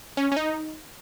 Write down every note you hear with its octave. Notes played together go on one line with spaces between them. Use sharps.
C#4
C#4
D#4